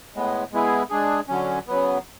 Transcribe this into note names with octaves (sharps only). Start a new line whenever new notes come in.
A2 G#3 B3
G#3 B3 E4 G#4
G#3 D4 G#4
D3 F#3 C#4
C#3 F#3 B3